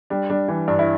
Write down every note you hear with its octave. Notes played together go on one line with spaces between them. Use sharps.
G3 D4
G3 D4
E3 D4
G2 D4
E4